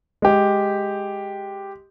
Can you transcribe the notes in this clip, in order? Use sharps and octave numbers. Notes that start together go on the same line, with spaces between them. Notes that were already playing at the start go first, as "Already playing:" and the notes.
G#3 G4